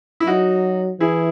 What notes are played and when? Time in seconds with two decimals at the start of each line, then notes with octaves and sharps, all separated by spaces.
0.20 E4
0.27 F#3 D#4 F#4
1.00 E3 E4 G#4